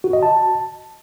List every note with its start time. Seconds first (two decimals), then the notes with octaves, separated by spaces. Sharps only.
0.04 F#4
0.13 D#5
0.23 A5